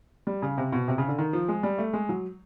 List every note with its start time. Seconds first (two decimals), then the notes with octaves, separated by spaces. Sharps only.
0.27 G3
0.42 C#3
0.58 C3
0.72 B2
0.88 C3
0.98 C#3
1.08 D3
1.18 D#3
1.33 F3
1.48 G#3
1.63 G3
1.78 A3
1.93 G#3
2.09 F#3